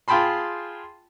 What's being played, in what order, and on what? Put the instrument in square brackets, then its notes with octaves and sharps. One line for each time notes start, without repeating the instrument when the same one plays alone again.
[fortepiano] F4 G#4 G5 A5 B5 C6